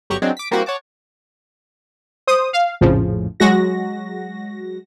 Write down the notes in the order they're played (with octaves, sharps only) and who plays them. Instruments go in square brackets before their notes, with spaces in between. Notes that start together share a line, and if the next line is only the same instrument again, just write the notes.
[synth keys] G1 F#3 F#4 G4 A#5 C#6
F#3 G#3 C4 D4
D6 B6
G3 A#3 C4 E4 F#4 G4
C#5 F#5 A5 D6
[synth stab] C5 D#6
F5
A#1 F2 A2 C#3 F3
F#3 G#3 F#4 A#6